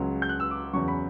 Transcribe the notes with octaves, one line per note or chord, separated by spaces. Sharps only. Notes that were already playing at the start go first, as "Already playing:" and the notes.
Already playing: C#2 C#3 F#3
G6
F#6
E6
D6
E2 C#3 F#3 C#6
B5